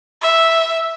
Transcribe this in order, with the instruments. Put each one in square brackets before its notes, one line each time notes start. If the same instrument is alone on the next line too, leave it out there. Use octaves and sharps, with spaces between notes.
[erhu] E5